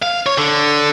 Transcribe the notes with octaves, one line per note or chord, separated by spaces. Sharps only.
F5
C#5
D3